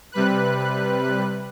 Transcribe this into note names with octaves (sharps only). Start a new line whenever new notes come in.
C3 G3 B4 F#6